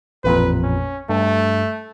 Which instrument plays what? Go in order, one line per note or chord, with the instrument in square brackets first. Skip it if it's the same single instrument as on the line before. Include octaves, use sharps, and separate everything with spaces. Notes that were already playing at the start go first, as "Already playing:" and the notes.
[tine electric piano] A1 F2 A#2 [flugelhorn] B4
[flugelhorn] C#4
[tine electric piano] G2 [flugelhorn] A3